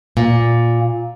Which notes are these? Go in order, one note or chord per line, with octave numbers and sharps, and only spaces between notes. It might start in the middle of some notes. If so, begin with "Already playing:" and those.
A#2